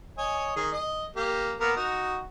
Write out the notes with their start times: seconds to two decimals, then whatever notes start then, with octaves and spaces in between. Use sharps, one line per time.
0.18 C#5 D#5 G#5
0.56 D#3 G#4
0.72 D#5
1.16 A#3 G4
1.60 A#3 B3 A#4
1.76 D#4 F#4